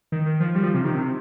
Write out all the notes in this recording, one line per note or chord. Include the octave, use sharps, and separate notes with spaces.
D#3
D#3
F3
G3
F3
C3
D#3
C3